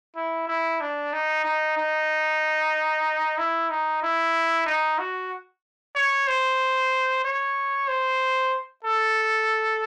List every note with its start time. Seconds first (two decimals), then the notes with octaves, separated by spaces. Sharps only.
0.16 E4
0.48 E4
0.81 D4
1.13 D#4
1.45 D#4
1.77 D#4
3.38 E4
3.70 D#4
4.03 E4
4.66 D#4
4.99 F#4
5.96 C#5
6.27 C5
7.25 C#5
7.88 C5
8.85 A4